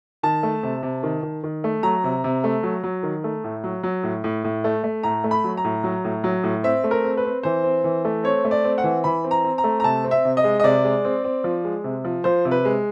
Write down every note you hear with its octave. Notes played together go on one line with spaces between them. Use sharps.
D#3 A5
A3
C3
C3
D#3
D#3
D#3
A3
F#3 A#5
C3
C3
A3
F#3
F#3
D#3
A3
A2
F#3
F#3
A2
A2
A2
A3
A3
A2 A#5
A3
B5
F#3
A#5
A2
F#3
A2
F#3
A2
C4 E5
A3
A#4
C4
B4
C4
E3 C5
C4
E3
A3
C4 C#5
A3
D5
C4
F#5
E3
E3 B5
C4
A#5
C4
A#5
A3
A#5
C3 A5
C4
E5
C3
D#5
G#3
D#5
C3 D5
G#3
C4
C4
F3
G#3
C3
F3
F3 C5
C3
B4
G#3